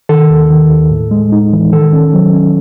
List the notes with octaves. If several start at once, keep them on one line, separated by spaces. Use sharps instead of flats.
D#3 A4
D#2
D#3
D#2
A2
G#3
D#4
E3
D#3 A4
C#4
F#3
C#4